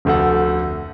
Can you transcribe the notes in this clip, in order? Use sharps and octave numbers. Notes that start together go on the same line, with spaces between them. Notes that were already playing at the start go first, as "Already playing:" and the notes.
F1 D2 A4 F#5